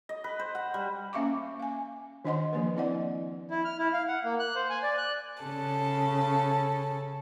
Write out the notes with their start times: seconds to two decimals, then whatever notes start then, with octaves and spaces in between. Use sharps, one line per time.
0.09 D#5
0.24 B4
0.39 C5
0.55 F#5
0.74 G3
1.13 A#3 C#4 E5 F5 C#6 D6
1.59 F5 G#5
2.25 D#3 D4 C5 D#5 F#5 C6
2.53 F3 A#3 B4
2.77 C4 E4 D5 D#5 F#5
3.50 E4
3.65 F6
3.78 E4
3.93 F5
4.08 F#5
4.24 A#3
4.40 F#6
4.56 C5
4.70 G#5
4.83 D5
4.98 F#6
5.42 C#3 A4